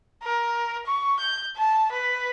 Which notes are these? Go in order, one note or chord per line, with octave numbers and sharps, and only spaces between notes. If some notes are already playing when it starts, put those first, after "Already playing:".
A#4
C#6
G6
A5
B4